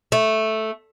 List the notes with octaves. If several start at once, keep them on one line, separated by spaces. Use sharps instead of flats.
A3